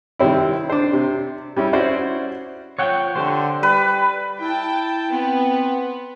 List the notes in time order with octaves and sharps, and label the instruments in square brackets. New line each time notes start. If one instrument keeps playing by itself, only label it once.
[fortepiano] C3 D#3 G3 C4 E4
D4 C5
C3
G3 C#4 E4
C#4 E4 F#4 C5 D5
[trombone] F3 [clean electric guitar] C#5 F#5 G5
[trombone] D3 [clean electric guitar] G4 C5
[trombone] G3 [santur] B4
[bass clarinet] E4 [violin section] G5 A5
[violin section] B3 [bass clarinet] C4